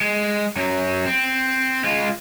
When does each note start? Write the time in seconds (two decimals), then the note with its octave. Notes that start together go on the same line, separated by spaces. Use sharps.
0.01 G#3
0.56 F#2 F#3
1.05 C4
1.84 G#3 F4